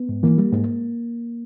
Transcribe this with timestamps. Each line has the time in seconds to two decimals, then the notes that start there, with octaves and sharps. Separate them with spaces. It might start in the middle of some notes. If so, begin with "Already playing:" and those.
Already playing: B3
0.09 G#2
0.23 E3 A#3
0.38 G3
0.52 G#2